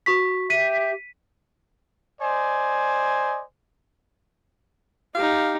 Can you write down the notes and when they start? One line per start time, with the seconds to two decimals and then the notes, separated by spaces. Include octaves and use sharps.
0.06 F#4 C#6 B6
0.50 G4 E5 B6 D#7
2.21 C5 D5 D#5 G#5
5.15 D#4 G4 F5